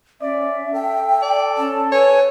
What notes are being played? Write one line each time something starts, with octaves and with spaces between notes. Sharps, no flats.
C#4 D5 E5
A4 G5
D5
C#4 A5
B4 C#5 G#5